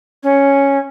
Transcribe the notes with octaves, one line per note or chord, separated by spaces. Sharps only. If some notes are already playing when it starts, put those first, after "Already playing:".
C#4